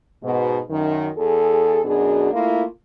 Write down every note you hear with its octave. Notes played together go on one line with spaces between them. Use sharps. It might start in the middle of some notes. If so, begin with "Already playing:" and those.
G#2 B2
F#2 D#3
E2 G#4 A4
F#2 B2 D4 G#4
A3 A#3 E4 F4